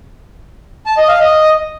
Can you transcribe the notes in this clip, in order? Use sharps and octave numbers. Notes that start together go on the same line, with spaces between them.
A5
D#5
F5
D#5